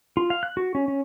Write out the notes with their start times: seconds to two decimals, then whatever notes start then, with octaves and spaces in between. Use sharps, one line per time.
0.17 F4
0.30 F5
0.43 F#6
0.57 F#4
0.75 C#4
0.88 C#4